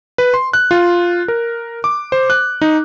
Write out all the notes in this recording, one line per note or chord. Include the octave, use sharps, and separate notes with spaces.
B4
C6
F#6
F4
A#4
D6
C5
F#6
D#4